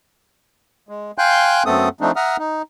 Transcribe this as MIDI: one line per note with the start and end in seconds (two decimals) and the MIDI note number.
0.89 1.11 56
1.18 1.63 77
1.18 1.63 79
1.18 1.63 80
1.18 1.63 84
1.18 1.63 90
1.18 1.63 91
1.66 1.89 42
1.66 1.89 57
1.66 1.89 59
1.66 1.89 60
1.66 1.89 69
1.66 1.89 87
2.01 2.12 53
2.01 2.12 57
2.01 2.12 60
2.01 2.12 62
2.01 2.12 63
2.16 2.37 76
2.16 2.37 78
2.16 2.37 82
2.16 2.37 87
2.16 2.37 89
2.39 2.62 63